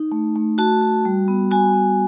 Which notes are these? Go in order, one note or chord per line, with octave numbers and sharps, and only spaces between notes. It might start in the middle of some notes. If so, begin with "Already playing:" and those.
Already playing: D#4
A3
A3
F#4 A5
F#4
G3
B3
F#4 G#5
B3